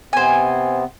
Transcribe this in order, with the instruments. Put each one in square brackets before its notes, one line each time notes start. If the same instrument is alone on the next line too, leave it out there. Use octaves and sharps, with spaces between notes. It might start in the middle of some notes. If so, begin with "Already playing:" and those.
[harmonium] C3 B3 C4 [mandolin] C5 G#5